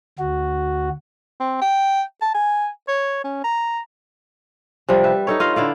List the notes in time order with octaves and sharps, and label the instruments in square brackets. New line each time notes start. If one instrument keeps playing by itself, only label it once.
[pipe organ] D2 F#4
[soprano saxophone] C4
G5
A5
G#5
C#5
C#4
A#5
[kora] C3 F3 G3
B4 E5
D#4 A4 C#5
F4 D#5 F5
D3 E4 D5 F5